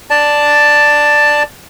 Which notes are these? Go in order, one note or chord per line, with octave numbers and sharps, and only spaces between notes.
D5 A5